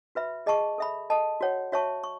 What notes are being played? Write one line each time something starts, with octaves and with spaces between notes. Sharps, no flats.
F#4 B4 E5 B5
G#4 D#5 A5 C#6
A4 E5 B5
A4 D#5 A5
F#4 C#5 F#5
F#4 C#5 E5 A5 C#6
C#6